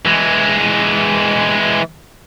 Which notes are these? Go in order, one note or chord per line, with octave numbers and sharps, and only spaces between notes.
E3 G#3